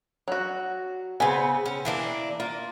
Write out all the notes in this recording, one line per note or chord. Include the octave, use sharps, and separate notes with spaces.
F#3 F#4
C#3 B3 C4 G#5
C#4
E3 A#3 D4
A#3 F4